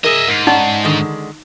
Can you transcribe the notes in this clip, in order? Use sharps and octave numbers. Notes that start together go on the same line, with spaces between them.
G#4 A#4 D#5 E5
G#2 A#4
C#4 D#4 D5 F#5
D3 D#3 G#3